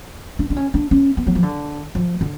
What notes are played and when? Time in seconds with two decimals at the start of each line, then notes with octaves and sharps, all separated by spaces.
0.39 D4
0.50 D4
0.57 C#4
0.74 D4
0.91 C#4
1.17 B3
1.27 F#3
1.35 F3
1.43 D3
1.95 F3
2.21 D3